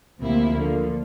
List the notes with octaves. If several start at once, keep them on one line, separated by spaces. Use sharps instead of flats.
D2 C3 F3 A#3 E4
D3 F3 A#3